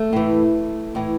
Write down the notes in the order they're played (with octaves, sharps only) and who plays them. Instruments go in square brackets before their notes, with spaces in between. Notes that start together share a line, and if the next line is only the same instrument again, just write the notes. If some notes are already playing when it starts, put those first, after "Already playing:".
Already playing: [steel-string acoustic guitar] A3
A2 E3
A2 E3